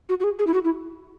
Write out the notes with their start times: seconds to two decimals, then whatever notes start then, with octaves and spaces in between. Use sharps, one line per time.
0.09 F#4
0.20 F#4
0.24 G#4
0.39 G#4
0.47 E4
0.54 F#4
0.65 E4